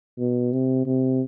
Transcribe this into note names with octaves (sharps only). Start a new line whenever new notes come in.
B2
C3
C3